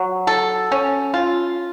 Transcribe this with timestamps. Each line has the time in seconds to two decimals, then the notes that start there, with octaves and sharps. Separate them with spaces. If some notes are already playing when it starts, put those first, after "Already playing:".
Already playing: F#3
0.27 A4
0.72 C#4
1.14 F4